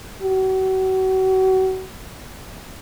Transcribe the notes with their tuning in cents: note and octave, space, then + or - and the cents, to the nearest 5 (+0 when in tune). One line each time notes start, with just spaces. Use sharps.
F#4 +35